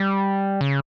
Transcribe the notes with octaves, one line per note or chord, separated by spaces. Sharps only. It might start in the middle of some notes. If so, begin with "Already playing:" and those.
Already playing: G3
C#3